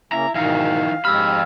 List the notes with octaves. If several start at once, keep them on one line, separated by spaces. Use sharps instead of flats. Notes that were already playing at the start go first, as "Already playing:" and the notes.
C#3 A#3 C#4 E4 A#5
G#2 B2 D#3 E3 D#4 F5
F2 G#2 G#3 G4 B5 E6 F6